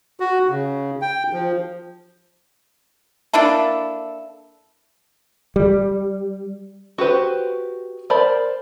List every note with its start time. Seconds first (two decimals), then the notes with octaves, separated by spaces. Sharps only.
0.20 F#4
0.49 C#3
1.01 G5
1.33 F3
3.33 A#3 D4 E4 A4
5.56 G3
6.98 F#4 G4 B4 C5
8.10 A#4 C5 D5 A5 B5